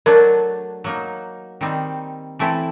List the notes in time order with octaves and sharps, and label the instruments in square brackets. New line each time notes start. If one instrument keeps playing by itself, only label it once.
[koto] F#3 A3 D4 [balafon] A#4
[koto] F#3 A#3 D#4
D#3 G3 C4 D#4
E3 A3 C4 E4